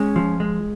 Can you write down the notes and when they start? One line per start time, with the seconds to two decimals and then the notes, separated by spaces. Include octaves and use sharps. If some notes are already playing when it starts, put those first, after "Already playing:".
Already playing: G#3 C#4
0.16 F3
0.40 G#3